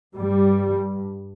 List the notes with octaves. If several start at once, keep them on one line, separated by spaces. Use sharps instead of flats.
G2 G3